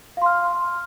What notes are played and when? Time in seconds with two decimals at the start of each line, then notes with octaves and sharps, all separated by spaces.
0.17 F5
0.22 C6
0.26 F6